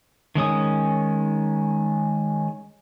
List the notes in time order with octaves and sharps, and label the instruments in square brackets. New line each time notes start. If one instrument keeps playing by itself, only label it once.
[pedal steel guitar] D#3 G#3 C#4 D#6